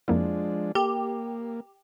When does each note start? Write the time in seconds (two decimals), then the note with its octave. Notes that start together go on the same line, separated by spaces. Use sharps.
0.08 F2 F3 G#3 A#3 D4 E4
0.75 A#3 G4 A4